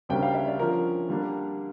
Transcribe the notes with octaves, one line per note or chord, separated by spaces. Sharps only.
D2 C#3 G3 A#3 D4 G5
F5
E5
D5
D3 F3 C#4 F4 A#4
D3 G3 A#3 D4